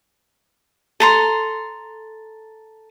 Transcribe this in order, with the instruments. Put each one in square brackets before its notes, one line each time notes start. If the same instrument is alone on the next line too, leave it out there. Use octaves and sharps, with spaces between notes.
[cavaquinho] A4 A#5 C6